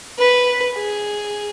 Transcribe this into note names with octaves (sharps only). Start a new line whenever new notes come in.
B4
G#4